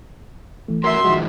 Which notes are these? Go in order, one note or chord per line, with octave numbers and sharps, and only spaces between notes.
E3 A3
E2 F#4 A#4 E5 C6
D#3 F3 G#3 F#4